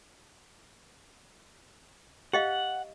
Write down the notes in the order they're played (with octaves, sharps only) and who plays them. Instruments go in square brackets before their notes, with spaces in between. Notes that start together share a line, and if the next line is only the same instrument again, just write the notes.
[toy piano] G4 D#5 F5 [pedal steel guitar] F#5